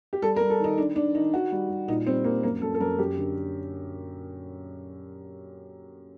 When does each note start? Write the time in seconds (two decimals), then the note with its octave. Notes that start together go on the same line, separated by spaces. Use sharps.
0.13 G4
0.22 G3 A4
0.36 A#4
0.41 G3
0.50 A4
0.60 D#3 D#4
0.78 D#3 D4
0.96 D#3 D4
1.15 D#3 D#4
1.33 D#3 F#4
1.52 G3
1.70 G3
1.88 A#2 D#4
2.07 G3 C4
2.24 G3 A#3
2.43 F#2 A#3
2.62 F#2 A4
2.74 A4
2.80 F#2 A#4
2.98 F#2 G4
3.17 D3